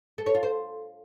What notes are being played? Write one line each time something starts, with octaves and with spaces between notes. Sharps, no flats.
A4
C#5
F4
C5